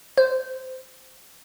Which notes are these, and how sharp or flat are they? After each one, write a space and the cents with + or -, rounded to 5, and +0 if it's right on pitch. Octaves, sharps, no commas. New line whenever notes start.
C5 -15